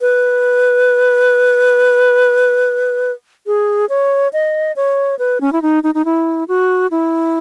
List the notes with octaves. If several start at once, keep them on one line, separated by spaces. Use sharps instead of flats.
B4
G#4
C#5
D#5
C#5
B4
C#4
E4
D#4
D#4
D#4
E4
F#4
E4